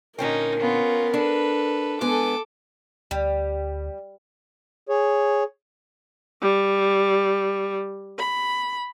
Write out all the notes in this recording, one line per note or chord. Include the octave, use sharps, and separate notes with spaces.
A#2 D3 C#4 D#4 A#4 G5
B3 C#4 F4
D4 A4 B4
G#3 B3 A4 G#5 D6
D2 G3
G#4 C#5
G3
B5